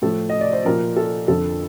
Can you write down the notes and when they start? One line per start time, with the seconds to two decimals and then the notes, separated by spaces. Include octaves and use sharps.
0.02 A2 F3 A4
0.29 D#5
0.41 D5
0.53 C5
0.65 A#2 F3 A#4
0.96 A4
1.28 F2 D3 F3 A4